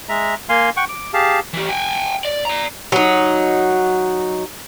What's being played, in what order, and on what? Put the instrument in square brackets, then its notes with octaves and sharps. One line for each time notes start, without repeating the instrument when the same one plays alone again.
[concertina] G#3 E5 A#5
A#3 F5 G#5 C6
F#5 G5 C#6
D6
G4 G#4 F5 A5
[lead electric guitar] E3 G4
G5 G#5
D5
D5 A#5
[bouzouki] F#3 D#4